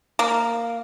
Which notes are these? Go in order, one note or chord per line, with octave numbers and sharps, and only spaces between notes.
A#3